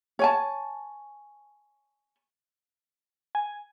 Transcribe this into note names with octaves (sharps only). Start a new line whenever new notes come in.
C#5 G#5 A5
G#5